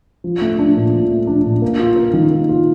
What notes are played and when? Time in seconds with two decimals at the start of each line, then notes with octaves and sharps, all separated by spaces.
0.24 F3
0.41 A3
0.59 D4
0.77 A#2
0.93 F3
1.11 A3
1.27 D4
1.45 A#2
1.62 A#3
1.79 F4
1.96 A#4
2.13 D#3
2.31 A#3
2.49 F4